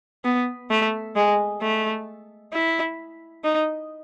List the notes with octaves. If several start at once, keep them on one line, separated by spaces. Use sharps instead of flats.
B3
A3
G#3
A3
E4
D#4